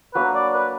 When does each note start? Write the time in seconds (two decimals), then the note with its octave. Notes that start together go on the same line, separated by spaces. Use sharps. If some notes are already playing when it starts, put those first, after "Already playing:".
0.14 F#3 A#3 D4 B4
0.34 D5
0.53 B4